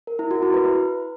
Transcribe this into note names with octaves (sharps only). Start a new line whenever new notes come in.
A#4
E4
F#4
E4
B4